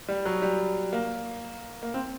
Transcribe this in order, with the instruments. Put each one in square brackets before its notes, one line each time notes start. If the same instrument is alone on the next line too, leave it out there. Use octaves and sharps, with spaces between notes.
[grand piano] G3
F#3
G3
A#3
A#3
C4